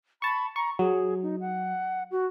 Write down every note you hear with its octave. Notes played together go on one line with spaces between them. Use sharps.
A5 B5 C#6
A#5 C#6
F#3 G#4
D#4
F#5
F#4